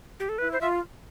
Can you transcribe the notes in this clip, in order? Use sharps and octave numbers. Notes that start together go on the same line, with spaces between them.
G4
A4
E4 B4
C5
F4 E5